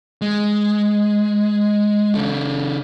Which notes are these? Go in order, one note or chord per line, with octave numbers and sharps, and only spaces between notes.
G#3
C#3 A4